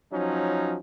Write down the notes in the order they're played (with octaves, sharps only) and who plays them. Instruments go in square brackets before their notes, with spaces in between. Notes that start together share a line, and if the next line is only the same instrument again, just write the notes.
[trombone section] F3 F#3 C#4 D#4